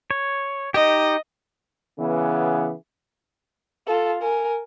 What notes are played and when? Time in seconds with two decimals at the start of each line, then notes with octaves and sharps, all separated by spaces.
0.11 C#5
0.74 D#4 G4 D#5
1.99 C#3 E3 B3
3.87 F4 A4
4.22 A#4 G#5